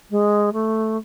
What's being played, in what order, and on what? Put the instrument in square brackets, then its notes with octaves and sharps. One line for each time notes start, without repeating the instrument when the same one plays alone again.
[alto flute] G#3
A3